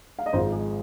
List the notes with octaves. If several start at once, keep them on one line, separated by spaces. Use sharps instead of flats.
F5
D#5
G#1 G#2 F3 C5
G#4